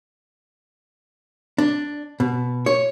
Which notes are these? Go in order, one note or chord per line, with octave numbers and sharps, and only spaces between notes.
D4
B2
C#5